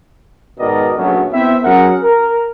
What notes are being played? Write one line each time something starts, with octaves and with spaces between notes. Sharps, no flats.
G#2 B2 D#3 A#4 D5 D#5
A#1 F#2 C#3 F#3 A3 B3
B3 C4 E4 C5 E5
F#3 C#4 G#4 A#4 F#5
A#4